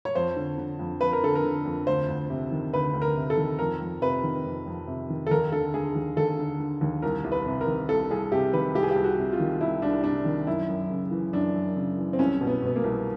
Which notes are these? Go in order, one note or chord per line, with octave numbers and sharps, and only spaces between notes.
C#5
F2 C5
D3
D3
F2
F2 B4
A#4
D3 A4
A#4
D3
F2
D2 C5
D2
C3
D#3
D2 B4
D2
A#4
C3
A4
D#3
F2 A#4
F2
C3 B4
D#3
F2
F2
C3
D#3
A4
D#2 A#4
D3 A4
D3 G#4
D#2
D#2 A4
D3
D3
D#2
C2 A#4
C2
B4
C3
A#4
D#3
C2 A4
C2 G#4
C3 G4
D#3 B4
C2 G4
G#4
C2 G4
F#4
C3
F4
D#3
C2 E4
C2 D4
C3 D4
D#3
F#2 E4
F#2
C#3
E3
F#2 D4
F#2
C#3
E3
C4
C2 C#4
B2
B3
B2 B3
A#3
C2